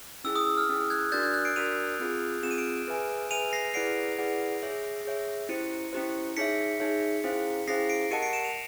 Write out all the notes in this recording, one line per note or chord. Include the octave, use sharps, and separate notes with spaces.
C#4 E4 G#4 E6
D#6
E6
F6
C#4 E4 G#4
F#6 G#6
D4 F#4 A#4 D5 G6 A6
F#6 G#6
F#6 G#6
C7 D7
D4 F#4 A#4 D5 D#7 F7
C4 F4 G#4
C4 F4 G#4 E7
D#7
D7 E7
G#4 B4 E5 G#5
G#4 B4 E5 G#5 D#7 F7
A#6 C7
E4 G#4 B4 D5 F#5 C7 D7
E4 G#4 B4 D5 F#5
G#4 C#5 E5
G#4 C#5 E5
C#4 E4 G4 C5 C#7 D#7
C#4 E4 G4 C5
D#4 G#4 C#5 E5 B6 C#7
D#4 G#4 C#5 E5
C#4 E4 G#4 C5 F5
C#4 E4 G#4 C5 F5 A#6 C7
C7 D7
G4 A#4 D#5 F#5 A5 C#7 D#7
C7 D7
D7 E7
D#7 F7